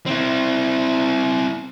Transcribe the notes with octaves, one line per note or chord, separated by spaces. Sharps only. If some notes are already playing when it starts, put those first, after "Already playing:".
C4 E4